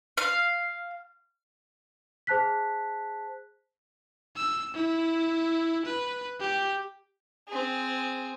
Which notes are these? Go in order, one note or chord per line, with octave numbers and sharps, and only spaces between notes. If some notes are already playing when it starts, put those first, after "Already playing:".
F5
G#4 C5 A5 F#6 B6
E6
E4
B4
G4
C4 G#4